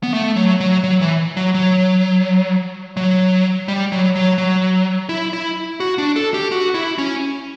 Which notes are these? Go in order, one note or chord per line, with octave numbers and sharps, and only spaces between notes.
B3
A3
F#3
F#3
F#3
E3
F#3
F#3
F#3
G3
F#3
F#3
F#3
E4
E4
F#4
D4
A4
G4
F#4
E4
C#4